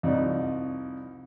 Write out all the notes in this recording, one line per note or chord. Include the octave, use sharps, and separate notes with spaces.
C2 F2 D#4 D5